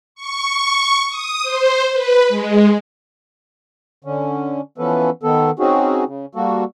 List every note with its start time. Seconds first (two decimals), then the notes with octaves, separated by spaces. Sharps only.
0.15 C#6
1.09 D#6
1.43 C5
1.92 B4
2.29 G#3
4.04 D3 C#4
4.78 E3 F3 B3 C#4 A4 B4
5.23 D#3 B3 A4
5.59 C4 C#4 D#4 F#4 G#4
6.06 C#3
6.35 G3 A#3 F#4 A4